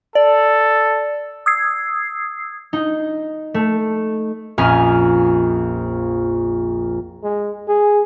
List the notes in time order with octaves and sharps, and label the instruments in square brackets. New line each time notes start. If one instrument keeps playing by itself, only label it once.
[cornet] A4 [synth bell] D5
[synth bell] D#6 E6 G#6 C7
[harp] D#4
A3
A#1 F2 C#4 G#5 F6
[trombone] G#3
G#4